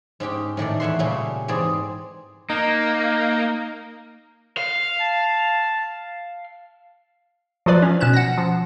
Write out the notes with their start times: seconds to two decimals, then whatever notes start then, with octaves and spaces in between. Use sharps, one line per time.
0.20 G#2 C#4 G4 G5
0.57 A2 D#3 A3 D5
0.80 E2 A2 C#5 E5 F#5 C6
0.99 A#2 C#3 G3 C#4 G4 A4
1.48 E2 G#2 C4 G#4 D5
2.50 A#3 D#4
4.57 F5
5.00 A5
7.66 F3 F#3 F4 B4 D5
7.82 C#4
8.00 B2 C#4 F#6 E7
8.13 F#5 A#6
8.38 F3